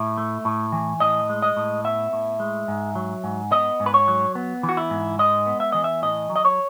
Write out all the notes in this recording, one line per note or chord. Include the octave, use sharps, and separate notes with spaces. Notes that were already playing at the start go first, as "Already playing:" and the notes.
Already playing: A2 E5
A3
A2
E3
A2 D#5
G#3
D#5
A2
B3 E5
A2
G#3
G#2
F#3
G#2
B3 D#5
G#2
B4
C#5
F#3
B3
E3
F#4
E4
G#2
G#3 D#5
B3
E5
E3 D#5
E5
A2 D#5
F#3
D#5
C#5